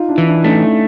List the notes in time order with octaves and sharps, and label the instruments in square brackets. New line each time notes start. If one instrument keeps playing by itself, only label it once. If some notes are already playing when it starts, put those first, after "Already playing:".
Already playing: [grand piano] D#4 F4
D4 E4
[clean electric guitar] E3
[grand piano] D4 E4
[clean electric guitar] A3 [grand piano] C#4 D#4